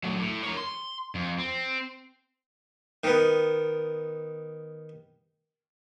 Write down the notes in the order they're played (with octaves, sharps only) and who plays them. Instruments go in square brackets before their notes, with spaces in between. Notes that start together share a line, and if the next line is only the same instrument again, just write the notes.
[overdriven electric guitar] F#3 A3
A2
A#4 C#5
C6
F2
C4
[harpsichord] D#3 B3